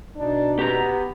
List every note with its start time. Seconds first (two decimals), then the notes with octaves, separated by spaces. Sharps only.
0.17 B2 D4 D#4
0.59 B3 G4 A#5